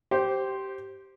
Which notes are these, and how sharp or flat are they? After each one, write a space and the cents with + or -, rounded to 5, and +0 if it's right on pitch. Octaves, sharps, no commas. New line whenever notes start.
G4 -10 C5 +0